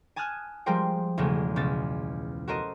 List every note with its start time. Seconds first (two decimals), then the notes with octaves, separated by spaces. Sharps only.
0.16 G#5 A5 D#6 F6 F#6 G#6
0.66 F3 G3 G#3 A#4 C5 G5
1.17 B1 E2 C#3 G#3 A3
1.56 C#2 B2 A6
2.48 F#4 A4 A#4 C5 D#5